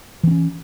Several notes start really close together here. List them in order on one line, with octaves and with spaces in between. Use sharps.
E3 C4 C#4